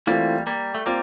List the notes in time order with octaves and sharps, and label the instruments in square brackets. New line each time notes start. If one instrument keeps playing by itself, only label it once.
[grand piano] E3 A3 C4 F4 [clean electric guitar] G3 A#3
[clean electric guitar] G3 A#3
A3
[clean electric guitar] G3 A#3 [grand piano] C4 F4